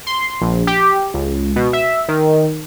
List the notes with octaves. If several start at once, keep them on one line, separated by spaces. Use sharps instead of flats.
C6
A#1
G4
C#2
B2
E5
D#3